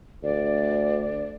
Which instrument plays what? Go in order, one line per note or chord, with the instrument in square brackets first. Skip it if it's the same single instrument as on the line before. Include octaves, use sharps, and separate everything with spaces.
[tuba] D2 [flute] D5